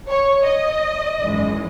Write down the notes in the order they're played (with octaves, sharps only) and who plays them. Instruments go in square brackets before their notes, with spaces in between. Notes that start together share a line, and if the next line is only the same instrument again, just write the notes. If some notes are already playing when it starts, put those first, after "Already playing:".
[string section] C#5
D#5
G#1 F#2 E3 G#3